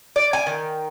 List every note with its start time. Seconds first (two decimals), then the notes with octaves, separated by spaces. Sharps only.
0.16 D5
0.33 G#5
0.47 D#3